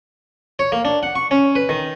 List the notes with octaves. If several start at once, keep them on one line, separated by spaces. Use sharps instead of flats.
C#5
A#3
D4
F#5
C#6
C#4
B4
D#3